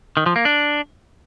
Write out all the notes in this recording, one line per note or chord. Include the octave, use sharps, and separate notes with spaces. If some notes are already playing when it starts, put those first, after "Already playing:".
D#3
F3
A#3
D4